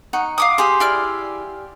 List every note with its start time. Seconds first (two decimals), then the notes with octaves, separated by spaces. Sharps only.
0.13 D#4 F#5 C#6
0.38 F5 D6 D#6
0.58 G4 G#4 C6
0.80 E4 D5 F6